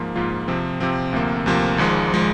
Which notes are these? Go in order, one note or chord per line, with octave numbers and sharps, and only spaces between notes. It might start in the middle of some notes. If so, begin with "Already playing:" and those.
Already playing: G#2 F3 A#3 F4
G#2 F3 A#3 F4
C3 F3 C4
C3 F3 C4
D2 C3 F3 A#3
D2 C3 F3 A#3
G#1 G#2 F3 G#3
F3 G#3